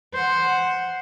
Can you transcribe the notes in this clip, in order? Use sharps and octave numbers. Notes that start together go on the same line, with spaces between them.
C5 F#5